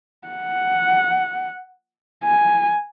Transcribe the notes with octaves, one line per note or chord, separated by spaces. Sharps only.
F#5
G#5